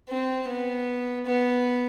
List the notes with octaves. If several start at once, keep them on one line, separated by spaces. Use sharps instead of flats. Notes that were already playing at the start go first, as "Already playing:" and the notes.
C4
B3
B3